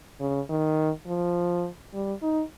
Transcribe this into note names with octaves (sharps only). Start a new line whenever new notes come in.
C#3
D#3
F3
G3
D#4